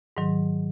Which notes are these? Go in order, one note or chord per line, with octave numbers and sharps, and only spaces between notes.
G#2 D#3 F#3